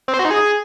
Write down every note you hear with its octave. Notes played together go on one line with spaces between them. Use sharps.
C4
C5
F#4
D#4
G#4